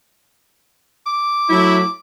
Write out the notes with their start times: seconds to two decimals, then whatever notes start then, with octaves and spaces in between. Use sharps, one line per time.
1.06 D6
1.49 F#3 A3 E4